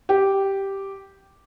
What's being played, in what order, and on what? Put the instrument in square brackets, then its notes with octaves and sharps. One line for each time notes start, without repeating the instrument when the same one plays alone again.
[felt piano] G4